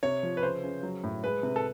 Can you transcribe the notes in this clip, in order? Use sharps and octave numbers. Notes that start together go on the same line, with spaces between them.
C3 C#5
F3
B4
C#3 C5
C#3
F#3
A2
G#3 B4
C3
A4